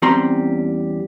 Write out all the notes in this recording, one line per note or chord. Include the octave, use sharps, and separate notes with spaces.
E2 G3 C4 C#4 A#5 C6